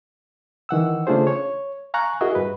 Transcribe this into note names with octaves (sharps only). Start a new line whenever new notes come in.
D#3 E3 F#5 E6
C#3 A3 D4 F4 G#4 C5
C#5
F5 G#5 A#5 C#6 F#6
E4 F#4 G#4 A#4 D#5 E5
G2 B4